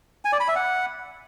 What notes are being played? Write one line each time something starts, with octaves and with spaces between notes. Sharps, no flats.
G#5
D5
B5
E5
F#5